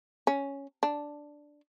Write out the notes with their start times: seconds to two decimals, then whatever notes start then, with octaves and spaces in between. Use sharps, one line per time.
0.27 C#4
0.83 D4